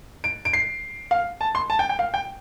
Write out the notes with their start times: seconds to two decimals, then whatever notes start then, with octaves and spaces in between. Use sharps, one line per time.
0.24 D7
0.45 D7
0.53 C7
1.11 F5
1.41 A5
1.55 C6
1.70 A5
1.79 G5
1.89 G5
1.99 F5
2.14 G5